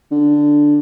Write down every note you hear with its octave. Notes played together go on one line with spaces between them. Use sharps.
D3